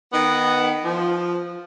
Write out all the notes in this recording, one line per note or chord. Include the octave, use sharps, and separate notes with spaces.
D#3 B3
F3